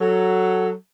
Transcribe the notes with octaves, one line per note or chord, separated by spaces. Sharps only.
F#3 A4